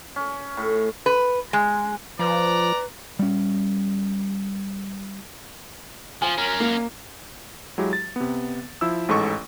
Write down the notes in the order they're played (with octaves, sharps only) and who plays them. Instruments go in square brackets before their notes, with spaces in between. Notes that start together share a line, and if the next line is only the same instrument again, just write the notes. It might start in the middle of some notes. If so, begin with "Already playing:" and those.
[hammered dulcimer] C#4
A2
[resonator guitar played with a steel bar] B4
G#3
[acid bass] F3 [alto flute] B4 [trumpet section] D5 A#5
[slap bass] G3 C#4
[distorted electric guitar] F3 [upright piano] G#5
[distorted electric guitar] C#4 A#4
[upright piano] A#3
[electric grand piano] F#3 G#3 E4 G4
A6
C3 B3
F3 E4 E6
A1 G#2 A4 C#6